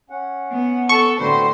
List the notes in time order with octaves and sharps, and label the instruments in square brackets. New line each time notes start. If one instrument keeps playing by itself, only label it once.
[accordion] C#4 F#5
[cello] B3
[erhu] A4 [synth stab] C#6
[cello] A2 D3 [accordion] C4 F#4 B4 [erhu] C5